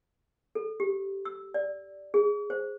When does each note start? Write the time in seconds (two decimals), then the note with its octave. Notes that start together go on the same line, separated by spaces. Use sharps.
0.55 A4
0.80 G4
1.25 E6
1.54 D5
2.14 G#4
2.50 C5